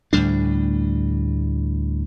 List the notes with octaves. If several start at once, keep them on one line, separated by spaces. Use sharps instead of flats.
D2 A2 G3 D4